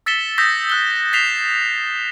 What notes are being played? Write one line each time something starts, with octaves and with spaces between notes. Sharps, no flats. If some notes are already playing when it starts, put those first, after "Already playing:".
E6 A6 B6 C#7 E7 G7
D#6 E6 G6 A#6 B6
E6 F#6 G7
A6 B6 C7 E7 F7 G7